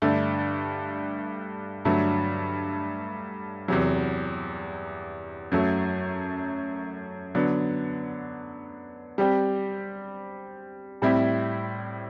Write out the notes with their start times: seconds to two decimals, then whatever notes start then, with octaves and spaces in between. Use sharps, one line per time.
0.02 G2 D3 A3
1.85 G2 D3 F#3 A3
3.68 E2 C3 F#3
5.52 F#2 F#3 A3
7.35 D3 F#3 B3
9.18 G3 C4 G4
11.02 A2 G3 C4 E4